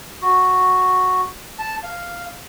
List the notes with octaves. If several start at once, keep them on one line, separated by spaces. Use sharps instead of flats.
F#4
A5
F5